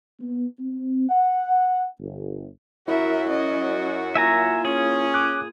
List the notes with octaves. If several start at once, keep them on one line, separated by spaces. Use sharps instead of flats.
B3
C4
F#5
G1
F#2 E4 F#4 A#4 E5
C#4 D#5
A#3 F4 E5 G#5 A#5
C#4 G#4
D6 F#6